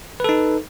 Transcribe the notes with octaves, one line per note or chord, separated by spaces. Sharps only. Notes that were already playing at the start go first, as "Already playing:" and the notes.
D#4 A4 B4